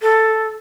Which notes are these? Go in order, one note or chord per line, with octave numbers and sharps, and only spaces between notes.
A4